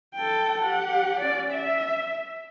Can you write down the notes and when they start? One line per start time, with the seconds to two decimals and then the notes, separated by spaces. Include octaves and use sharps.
0.15 A4 G5
0.62 G4 F#5
1.20 C#4 D5
1.52 E5